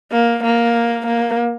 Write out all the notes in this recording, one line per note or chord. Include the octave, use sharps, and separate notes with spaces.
A#3
A#3
A#3